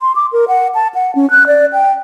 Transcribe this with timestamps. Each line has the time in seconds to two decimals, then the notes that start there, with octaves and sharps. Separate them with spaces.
0.01 C6
0.15 D6
0.33 A#4
0.48 F#5
0.75 A5
0.95 F#5
1.15 C#4
1.31 F#6
1.47 D5
1.73 G5